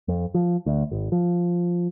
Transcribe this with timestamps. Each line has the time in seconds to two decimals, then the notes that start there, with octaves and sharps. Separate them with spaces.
0.08 F2
0.34 F3
0.66 D2
0.91 G#1
1.12 F3